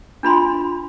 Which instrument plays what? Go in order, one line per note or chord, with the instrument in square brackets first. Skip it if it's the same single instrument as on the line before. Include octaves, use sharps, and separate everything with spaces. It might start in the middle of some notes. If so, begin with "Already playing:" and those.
[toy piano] D4 F4 B5 C6